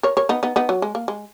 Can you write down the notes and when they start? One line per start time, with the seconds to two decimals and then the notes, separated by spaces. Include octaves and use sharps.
0.03 A#4 C#5
0.17 A#4 C#5
0.29 B3 D#4
0.43 B3 D#4
0.56 B3 D#4
0.69 F#3
0.82 G#3
0.95 A#3
1.08 G#3